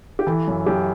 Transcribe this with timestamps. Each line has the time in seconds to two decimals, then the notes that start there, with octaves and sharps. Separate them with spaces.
0.19 G4
0.27 E3 A4
0.47 F#2
0.66 F#2 G4